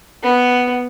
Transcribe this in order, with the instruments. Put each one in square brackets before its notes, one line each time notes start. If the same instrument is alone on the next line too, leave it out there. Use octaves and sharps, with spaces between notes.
[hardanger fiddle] B3